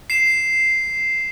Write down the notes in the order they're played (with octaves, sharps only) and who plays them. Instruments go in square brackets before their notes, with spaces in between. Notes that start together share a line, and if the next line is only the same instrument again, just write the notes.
[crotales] C7 E7